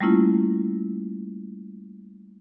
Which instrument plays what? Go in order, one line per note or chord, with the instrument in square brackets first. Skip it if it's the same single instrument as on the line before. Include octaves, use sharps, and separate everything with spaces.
[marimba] G3 A3 A#3 C#4 E4 F4